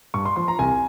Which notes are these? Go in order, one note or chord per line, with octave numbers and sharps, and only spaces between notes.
G2 C#6
C6
F3 C6
A#5
C2 G#5